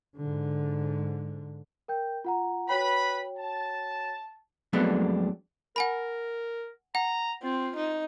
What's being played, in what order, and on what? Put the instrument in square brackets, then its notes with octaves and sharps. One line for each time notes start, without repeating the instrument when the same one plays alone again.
[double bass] G#2 D3
[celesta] A#4 G5 G6
F4 F#5 A#5
[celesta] F#4 C#5 G5 [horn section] B4 B5
[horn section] A5
[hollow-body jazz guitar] F2 F#3 G#3 A3 B3 D4
[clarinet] A#4 [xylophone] F#5 G#5 B5
[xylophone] F#5 [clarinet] A#5
[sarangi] C4 [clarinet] F4
[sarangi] D#4